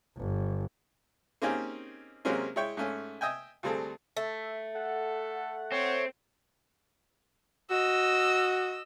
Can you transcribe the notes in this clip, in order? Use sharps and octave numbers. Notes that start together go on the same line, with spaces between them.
G1
A#3 C4 C#4 D#4 G4 G#4
C3 F#3 G#3 A#3 C4 C#4
G#3 E4 C#5 G5
G#2 A3 C#4
D#5 E5 G5 G#5
D2 G3 C4 G#4 A4
A3 E5
A4 F#5
C4 C#5
F#4 D#5 E6